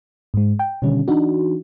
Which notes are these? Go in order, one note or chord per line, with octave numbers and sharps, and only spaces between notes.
G#2 G#3
G5
B2 D3 D#3 G3 C#4
E3 D4 D#4 F#4